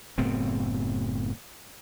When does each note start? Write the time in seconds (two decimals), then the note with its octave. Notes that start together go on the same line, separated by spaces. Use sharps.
0.18 F#1 A2 B3 C4